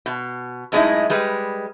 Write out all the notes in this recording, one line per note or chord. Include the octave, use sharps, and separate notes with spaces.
B2
F#2 A2 G#3 C#4 D#4 E4
G3 G#3 B4